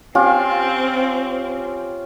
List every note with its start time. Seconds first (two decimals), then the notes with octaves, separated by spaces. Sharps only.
0.15 C4 C#4 F4 G4